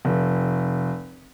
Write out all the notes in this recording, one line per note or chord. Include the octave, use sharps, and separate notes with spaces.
F1